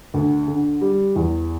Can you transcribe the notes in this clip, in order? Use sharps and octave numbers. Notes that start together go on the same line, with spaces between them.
D2
D3
G3
E2